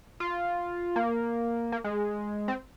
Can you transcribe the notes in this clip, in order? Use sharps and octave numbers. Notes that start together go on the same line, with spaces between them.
F4
A#3
A#3
G#3
C4